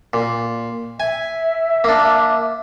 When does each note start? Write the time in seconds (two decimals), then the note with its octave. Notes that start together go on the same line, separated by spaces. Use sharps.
0.13 A#2
1.00 E5 G#5
1.84 A#3 D4